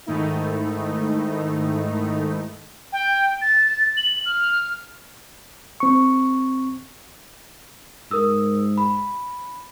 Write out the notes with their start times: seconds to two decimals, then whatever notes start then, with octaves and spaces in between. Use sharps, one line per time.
0.06 G#2 D#3 A3 D#4 E4
2.92 G5
3.42 A6
3.97 F#7
4.26 F6
5.80 C4 C#6
8.11 G#2 A#4 D#6 E6
8.78 B5